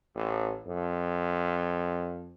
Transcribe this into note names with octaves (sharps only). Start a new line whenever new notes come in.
A1
F2